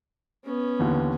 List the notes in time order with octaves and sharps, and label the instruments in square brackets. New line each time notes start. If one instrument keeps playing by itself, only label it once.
[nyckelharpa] B3 C#4
[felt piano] D#2 D3 E3